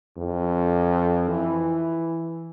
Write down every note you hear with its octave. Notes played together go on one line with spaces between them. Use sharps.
F2
E3